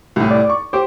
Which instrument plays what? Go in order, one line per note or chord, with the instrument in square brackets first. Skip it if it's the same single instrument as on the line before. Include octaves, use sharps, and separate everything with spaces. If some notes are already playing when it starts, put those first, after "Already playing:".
[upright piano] C2 A2
[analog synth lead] D5
[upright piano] C#6
[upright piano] G4 C5 [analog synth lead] D6